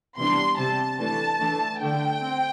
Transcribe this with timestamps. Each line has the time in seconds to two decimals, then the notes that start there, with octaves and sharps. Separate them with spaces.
0.17 C3 E3 G3 B3 D4 C6
0.58 C3 G3 C4 A5
0.99 E3 A3 D4 A5
1.40 E3 A3 D4
1.81 D3 A3 D4 G5
2.21 C4